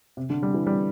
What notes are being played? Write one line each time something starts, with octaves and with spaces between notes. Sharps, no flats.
C3
D3
G3
E3
G3